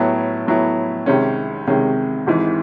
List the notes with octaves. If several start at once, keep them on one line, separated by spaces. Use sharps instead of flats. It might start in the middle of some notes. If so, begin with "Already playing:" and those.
Already playing: A2 F#3 B3 E4
A2 F#3 B3 E4
C2 C3 D#3 G#3 C#4
C2 C3 D#3 G#3 C#4
G#1 G#2 E3